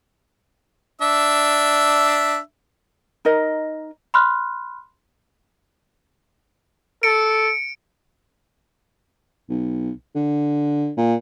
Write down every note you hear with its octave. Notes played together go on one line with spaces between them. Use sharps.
D4 E5
D#4 A#4 D#5
B5 C6 F6 F#6
A4 C#7 D7
B1
D3
A#2